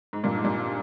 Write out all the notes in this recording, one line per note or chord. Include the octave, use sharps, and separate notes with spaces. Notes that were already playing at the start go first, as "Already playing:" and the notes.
G#2
G2 A#2
G#2
G2 A#2